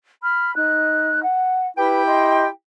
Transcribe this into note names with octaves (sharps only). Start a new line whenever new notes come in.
B5 F6
D#4 F#6
F#5
E4 G4 B4 G5
D#5 C6